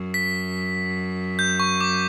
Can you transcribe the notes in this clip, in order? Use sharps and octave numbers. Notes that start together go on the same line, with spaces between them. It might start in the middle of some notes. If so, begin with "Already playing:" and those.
Already playing: F#2
B6
G6
C#6
D6